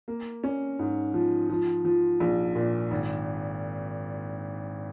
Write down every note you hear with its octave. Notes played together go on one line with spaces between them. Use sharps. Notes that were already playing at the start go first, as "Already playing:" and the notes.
A#3
C#4
G#2
F3
F3
F3
A#1
A#2
G#1